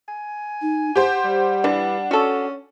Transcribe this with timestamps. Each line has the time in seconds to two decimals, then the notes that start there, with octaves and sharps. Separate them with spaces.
0.08 G#5
0.62 D#4
0.95 G4 C5 F#5
1.24 G3
1.64 E3 D4
2.11 C#4 F#4 A4